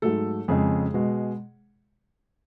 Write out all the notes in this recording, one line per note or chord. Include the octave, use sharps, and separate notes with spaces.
G#2 F#3 A3 A4
F2 C#3 G#3 G#4
B2 G#3